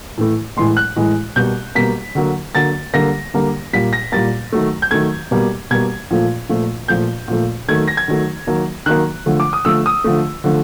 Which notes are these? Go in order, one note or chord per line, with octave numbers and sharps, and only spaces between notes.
A2 E3 A3
A2 E3 G#3 C6
F#6
A2 E3 G#3
B2 G3 A#3 G6
B2 G3 A#3 B6
D3 F#3 A#3
D3 F#3 A#3 A6
D3 G3 A#3 A#6
D3 G3 A#3
A#2 G3 A#3 B6
A#6
A#2 G3 A#3 A6
D#3 F#3 A3
G6
D#3 F#3 A3 G#6
B2 G3 A#3
B2 G3 A#3 G#6
A#2 F3 A3
A#2 F3 A3
A#2 F3 A3 G6
A#2 F3 A3
D#3 F#3 A3 G#6
A#6
G#6
D#3 F#3 A3
D#3 F#3 A#3
D#3 F#3 A#3 F#6
D3 F3 A3
D6
D#6
D3 F3 A3 E6
D#6
D3 F3 A3
D3 F3 A3